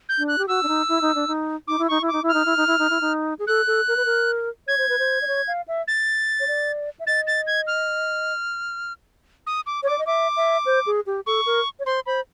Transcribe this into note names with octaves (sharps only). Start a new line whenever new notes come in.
G6
D4
F#6
G4
F#4 E6
D4
D#4
E4
D#4
D4
D#4
D#4 D6
E4
D#4 C#6
E4
D#4 D6
E4
F6
D#4
E4
D#4
E4
D#4
E4
D#4
G#4
A4 F#6
A4
A#4
B4
A#4
C#5 G#6
C5
B4
C5
D5
C#5
F5
E5
A6
C#5
D5
E5
D#5 A6
A6
G#6
F6
D#6
D6
C#5
D5 D6
D#5
E5 D6
E5
C5
G#4
G4
A4 C#6
A#4
C#5
C5 C6
C5 B5